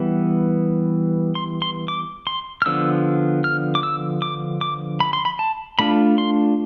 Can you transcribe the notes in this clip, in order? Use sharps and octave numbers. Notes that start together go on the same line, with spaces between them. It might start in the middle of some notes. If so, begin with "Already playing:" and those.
Already playing: E3 G3 B3
C6
C6
D6
C6
F6
D3 F3 B3 E6
F6
D6
E6
D6
D6
B5
C6
B5
A5
A3 D4 F4 B5
C6